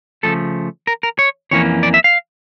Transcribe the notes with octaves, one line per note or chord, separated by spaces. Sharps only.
C#3 F3 A3 A4
A#4
A#4
C#5
F2 E3 A#3 C#4 C#5
D5
E5
F5